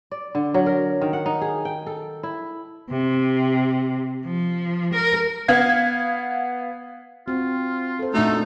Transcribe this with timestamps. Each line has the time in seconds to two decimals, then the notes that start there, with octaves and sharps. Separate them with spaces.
0.11 D5
0.35 D3
0.54 F#3
0.66 A#4
1.01 D#3
1.13 F#5
1.26 D#4
1.41 G#4
1.65 G5
1.87 A4
2.23 E4
2.90 C3
4.25 F3
4.93 A#4
5.48 B3 F5 G#6
7.28 C4 F4 F#4
7.99 A4 C5
8.14 A#2 A3 D4 D#4 F#4 A4